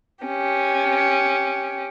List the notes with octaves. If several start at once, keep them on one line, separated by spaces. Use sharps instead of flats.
C#4 G4